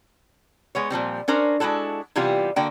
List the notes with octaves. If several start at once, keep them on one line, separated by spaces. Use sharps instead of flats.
G#3 B3 C#5
A#2 F3 G3 C4
C#4 D4 A#4 C5
G#3 D4 E4 F#4 A4
C3 E3 G3 B3 F4 G4
D3 A#3 F#4 D5 G5